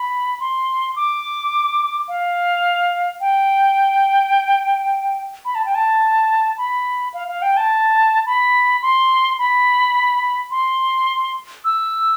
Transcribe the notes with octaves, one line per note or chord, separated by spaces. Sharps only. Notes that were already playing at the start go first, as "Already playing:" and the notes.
Already playing: B5
C6
D6
F5
G5
B5
A5
G5
A5
B5
F5
F5
G5
A5
B5
C6
B5
C6
E6